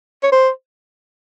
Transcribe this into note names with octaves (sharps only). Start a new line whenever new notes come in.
C#5
C5